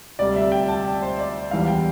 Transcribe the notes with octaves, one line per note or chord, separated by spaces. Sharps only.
D2 C3 G3 D5
E5
G5
A5
G5
C5
D5
E2 E3 G3 F5
G5